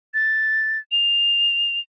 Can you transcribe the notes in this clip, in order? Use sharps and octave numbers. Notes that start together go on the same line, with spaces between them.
A6
F7